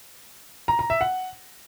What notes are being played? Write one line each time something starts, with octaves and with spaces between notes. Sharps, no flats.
A#5
A#5
E5
F#5